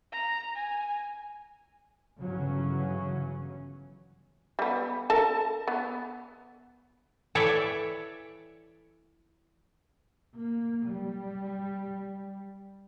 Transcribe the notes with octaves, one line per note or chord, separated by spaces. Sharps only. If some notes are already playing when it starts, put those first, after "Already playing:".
A#5
G#5
G1 C#3 E3 F#3 C#4
G3 B3
A4 A#4 A5
B3
E3 A4 C#5 D5 E5
A#3
G3